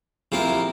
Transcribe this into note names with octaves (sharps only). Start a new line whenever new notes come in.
C3 F3 A#3 E4